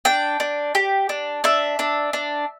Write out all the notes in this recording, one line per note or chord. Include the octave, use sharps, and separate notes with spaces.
D4 G5
D4
G4
D4
D4 E5
D4
D4